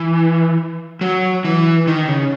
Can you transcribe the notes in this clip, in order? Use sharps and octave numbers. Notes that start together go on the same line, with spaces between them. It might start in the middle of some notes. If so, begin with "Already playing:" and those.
Already playing: E3
F#3
E3
D#3
C#3